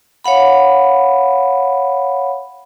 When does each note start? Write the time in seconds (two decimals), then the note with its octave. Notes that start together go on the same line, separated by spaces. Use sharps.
0.24 C#5 F5 F#5 B5